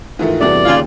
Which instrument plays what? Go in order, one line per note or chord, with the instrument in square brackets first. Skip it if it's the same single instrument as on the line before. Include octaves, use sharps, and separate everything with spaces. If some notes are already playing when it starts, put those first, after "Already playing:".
[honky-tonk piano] G#2 E3 A3 [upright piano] D#3 F4
[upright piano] E2 G2 C3 [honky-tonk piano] A3 D4 F#4 [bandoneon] D5
[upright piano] D#2 [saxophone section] C#3 F4